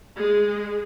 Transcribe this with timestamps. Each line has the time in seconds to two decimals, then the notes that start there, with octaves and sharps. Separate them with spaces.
0.16 G#3 G#4